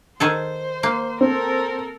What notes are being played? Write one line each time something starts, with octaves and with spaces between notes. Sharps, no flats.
D#3 G#4 A4 C5
A#3
C4 A4 A#4